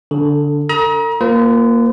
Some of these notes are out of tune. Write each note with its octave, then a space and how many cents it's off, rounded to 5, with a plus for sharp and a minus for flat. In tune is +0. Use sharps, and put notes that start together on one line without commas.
D3 -15 A4 +15
A4 +45 A#5 +35 D#6 +40
A#3 +0 F4 +0 C5 -45